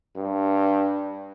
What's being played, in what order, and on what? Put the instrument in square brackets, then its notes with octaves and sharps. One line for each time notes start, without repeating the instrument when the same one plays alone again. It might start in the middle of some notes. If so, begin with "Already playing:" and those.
[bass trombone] G2